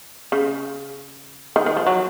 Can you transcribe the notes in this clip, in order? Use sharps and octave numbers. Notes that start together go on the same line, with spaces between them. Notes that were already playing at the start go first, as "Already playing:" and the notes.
C#3
D#3
D#3
F3
F#3